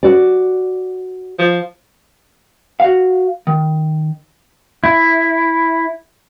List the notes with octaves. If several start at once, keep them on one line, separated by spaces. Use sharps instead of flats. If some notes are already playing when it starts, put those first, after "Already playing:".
F#4 D5
F3
F#4 F5
D#3
E4